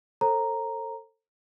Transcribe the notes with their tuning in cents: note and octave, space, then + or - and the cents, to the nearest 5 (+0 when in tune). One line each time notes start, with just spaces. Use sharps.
A4 +25 C5 +35 A#5 +0